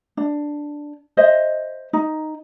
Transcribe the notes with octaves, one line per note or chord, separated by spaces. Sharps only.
D4
C5 D#5 E5
D#4